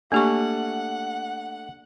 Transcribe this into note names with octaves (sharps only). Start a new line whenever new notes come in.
A3 A#3 D4 G4 F#5 C#6